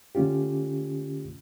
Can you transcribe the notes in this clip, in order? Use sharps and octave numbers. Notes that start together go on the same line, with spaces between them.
D3 A3 C#4 F4 G4